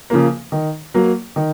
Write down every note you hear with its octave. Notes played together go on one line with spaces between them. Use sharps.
C#3 F3 A#3
D#3
F#3 A#3
D#3